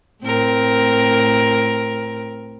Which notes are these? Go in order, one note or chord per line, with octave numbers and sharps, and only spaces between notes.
A2 C4 A#4